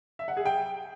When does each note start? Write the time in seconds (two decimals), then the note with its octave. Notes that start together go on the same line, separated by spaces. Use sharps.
0.19 E5
0.28 F#5
0.37 G#4
0.46 G5